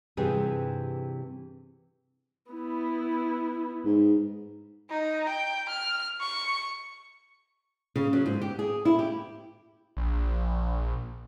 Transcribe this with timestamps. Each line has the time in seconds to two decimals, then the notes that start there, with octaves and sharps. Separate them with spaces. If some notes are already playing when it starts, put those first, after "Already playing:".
0.17 G2 C3 E3 F4 G4 G#4
2.51 B3 E4
3.85 G#2
4.90 D#4
5.29 G5
5.69 F6
6.21 C#6
7.96 C#3
8.13 F#3
8.26 G#2
8.41 G4
8.59 G#4
8.85 E4
8.99 G4
9.97 A#1